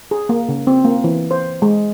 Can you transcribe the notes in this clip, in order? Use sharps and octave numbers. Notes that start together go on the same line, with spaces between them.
G#4
A#3
C#3
C4
A#3
E3
C5
G#3